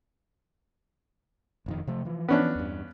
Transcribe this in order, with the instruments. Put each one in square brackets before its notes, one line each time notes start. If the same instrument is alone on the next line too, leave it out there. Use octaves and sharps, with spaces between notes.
[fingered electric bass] E1 F2 D#3
C3 F3 A3
E3 F3
[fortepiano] B3 C#4 D4
[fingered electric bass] E2 G2